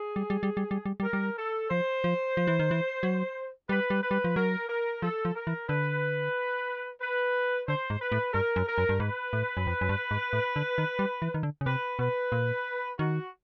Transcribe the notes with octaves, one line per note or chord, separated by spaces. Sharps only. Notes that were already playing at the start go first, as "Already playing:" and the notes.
Already playing: G#4
G3
G3
G3
G3
G3
G3
G3
A#4
G3
A4
F3 C5
F3
F3
E3
D#3
E3
F#3
G3 B4
G3
B4
G3
F3
F#3 A#4
A#4
F3 A4
F3
A#4
E3
D3 B4
B4
D3 C5
G#2
B4
A2
G2 A#4
F#2
A#4
F#2
G2
G#2 B4
A2
F#2
F2
F#2
G2
G#2
A2
D3
D#3
G3
E3
D#3
D3
C#3
C3 B4
B2 B4
A#2
D#3 F#4